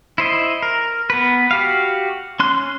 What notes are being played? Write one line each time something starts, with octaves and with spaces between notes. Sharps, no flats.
E4 C5 D#5
A#4
B3 B4
F#4 G4 F5
C#4 C6 F#6